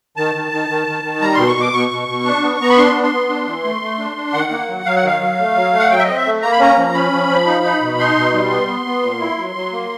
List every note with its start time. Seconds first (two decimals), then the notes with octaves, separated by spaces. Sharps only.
0.17 D#3 A5
0.35 D#3
0.52 D#3
0.69 D#3
0.87 D#3
1.04 D#3
1.22 G3 A#5
1.34 B2 C6
1.48 C#6
1.56 B2 D6
1.73 B2 C#6
1.91 B2
2.08 B2
2.25 D4
2.43 B3
2.61 B3 A#5
2.70 B5
2.77 D4 C6
2.95 B3
3.03 C6
3.12 B3
3.29 D4
3.47 E3
3.64 A3
3.82 A3
3.99 D4
4.17 D4
4.33 D#3 F#5
4.51 A#3
4.69 F#3
4.85 F#3 F5
4.96 F#5
5.03 D#3 F5
5.21 F#3
5.38 A3
5.56 F#3
5.73 A3
5.79 F#5
5.90 F#3 G5
5.99 E5
6.03 C4 D#5
6.17 E5
6.25 A3
6.42 A#3 A#5
6.52 B5
6.59 C#4 A#5
6.77 F3
6.94 C#4 B5
7.12 F3
7.29 F3
7.46 D#4
7.64 D#4
7.82 B2
7.99 D#4 C6
8.16 B2
8.34 G3
8.51 B3
8.68 B3
8.86 B3
9.03 A#2
9.20 E4
9.38 F#3
9.56 F#3
9.72 A#3